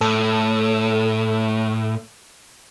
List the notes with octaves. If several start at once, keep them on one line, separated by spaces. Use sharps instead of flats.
A2 A4